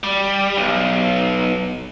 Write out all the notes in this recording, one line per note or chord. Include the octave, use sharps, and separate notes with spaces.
G3
B1